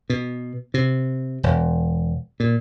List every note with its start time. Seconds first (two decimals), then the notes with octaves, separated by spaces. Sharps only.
0.10 B2
0.74 C3
1.43 E1
2.40 A#2